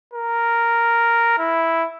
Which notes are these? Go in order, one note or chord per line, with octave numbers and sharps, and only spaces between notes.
A#4
E4